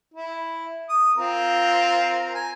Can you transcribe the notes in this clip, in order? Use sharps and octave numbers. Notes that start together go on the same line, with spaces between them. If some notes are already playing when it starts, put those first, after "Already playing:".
E4
D#6
C4 F4 A#4
G#5